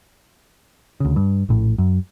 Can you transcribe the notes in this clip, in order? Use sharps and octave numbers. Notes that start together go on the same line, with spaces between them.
D2 C#3
G2
A#1 A2
F#2